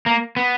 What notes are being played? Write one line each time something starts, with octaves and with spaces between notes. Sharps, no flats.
A#3
B3